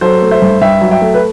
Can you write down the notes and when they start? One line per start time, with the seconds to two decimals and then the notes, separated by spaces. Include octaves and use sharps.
0.01 F#3 A4 C5
0.22 A3
0.31 C5 E5
0.42 G2
0.61 G2 E5 G5
0.81 F#3
0.91 E5 G5
1.01 A3
1.14 B4